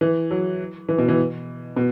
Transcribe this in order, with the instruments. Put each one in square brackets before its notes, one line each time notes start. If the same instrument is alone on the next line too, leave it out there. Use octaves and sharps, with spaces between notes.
[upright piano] E3
F#3
E3
B2
E3
B2